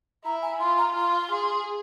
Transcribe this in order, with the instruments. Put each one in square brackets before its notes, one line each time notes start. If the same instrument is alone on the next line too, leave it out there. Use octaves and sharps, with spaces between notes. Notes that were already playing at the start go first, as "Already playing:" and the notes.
[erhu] E4 [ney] A#5
[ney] G#5
[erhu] F4 [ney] C6
[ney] A#5
[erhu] F4 [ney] C6
[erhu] G#4